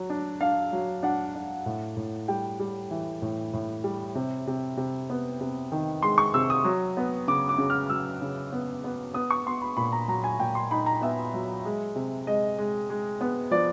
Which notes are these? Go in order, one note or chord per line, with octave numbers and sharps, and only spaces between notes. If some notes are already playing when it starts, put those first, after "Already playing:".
Already playing: F#3
D4
D4 F5
F#3
D4 F#5
D4
A2
A2
G3 G5
G3
E3
A2
A2
G3
C3
C3
C3
B3
C3
D#3
G#3 C6
C#6
C3 E6
D#6
F#3
B3
C#3 D6
D6
C#3
F6
F#3 E6
C#3
B3
B3
B3 D#6
C#6
B3 C6
B5
A#2 B5
A#5
F#3 A#5
G#5
A#2 G5
C6
D#4 B5
A#5
B3 E5
F#3
G#3
C3
G#3 D#5
G#3
G#3
B3
F3 D5